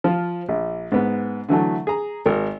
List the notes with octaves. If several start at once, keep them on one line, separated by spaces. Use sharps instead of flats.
F3 F4
A#1
G#2 B3
D3 E3 F#3 A3
G#4 A#5
G#1 A#4